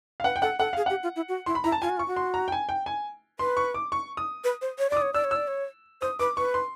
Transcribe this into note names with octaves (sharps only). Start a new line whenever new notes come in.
F5
B4 F#5
G5
A4 F#5
A4 F#5
G#4 F5
G4 F#5
F4
E4
F#4
E4 C6
B5
E4 A#5
A5
F4 G#5
F#4
F4 C#6
F#4
C6
A#5
G5
G#5
G5
G#5
B4 C6
C#6
D6
C#6
D#6
B4
C5
C#5
D5 D6
D#6
C#5
D5 E6
C#5
D5 E6
C#5
C5 D#6
B4 D6
B4 C#6
C6